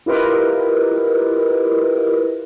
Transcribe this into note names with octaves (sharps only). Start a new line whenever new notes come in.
E4 F4 G4 A#4 B4 D#5